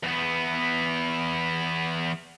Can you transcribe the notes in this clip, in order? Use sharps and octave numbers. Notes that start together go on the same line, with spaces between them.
E2 B3